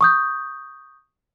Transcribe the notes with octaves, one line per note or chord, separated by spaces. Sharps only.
C#6 D#6 G6